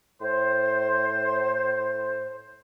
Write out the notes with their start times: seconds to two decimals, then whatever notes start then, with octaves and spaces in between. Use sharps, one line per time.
0.21 A2 C5